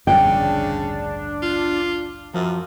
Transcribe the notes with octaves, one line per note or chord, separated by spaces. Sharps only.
A1 D2 G2 C#3 D4 G5
F4
F#2 F3